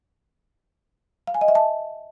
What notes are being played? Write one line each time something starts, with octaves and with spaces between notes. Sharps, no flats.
F5
G#5
D#5
E5
A5